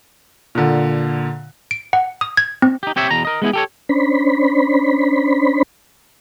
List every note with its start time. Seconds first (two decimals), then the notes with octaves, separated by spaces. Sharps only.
0.55 A#2 D3
1.71 D7
1.93 F#5
2.21 D#6
2.37 G#6
2.62 C4
2.83 D#4 G4
2.96 C4 G4 C#5 E5
3.11 E2 B2 A#5
3.25 A#4 D#5
3.42 G#3 B3 E4 G#4
3.53 G4 A4 C#5
3.89 C#4 D4 C5 B5